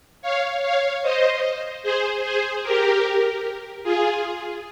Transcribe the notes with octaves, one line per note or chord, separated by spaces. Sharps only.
C#5 F5
C#5 F5
C5 D#5
G#4 C5
G#4 C5
G4 A#4
F4 G#4